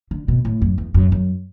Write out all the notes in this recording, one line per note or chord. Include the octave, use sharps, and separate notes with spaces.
D3
B2
A2
F#2
E2
F#2
F#2